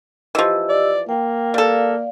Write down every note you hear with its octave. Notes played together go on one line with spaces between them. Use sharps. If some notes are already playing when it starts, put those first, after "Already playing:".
E3 F3 G4 D#5 E6
D5
A#3 G5
G3 A4 D5 F5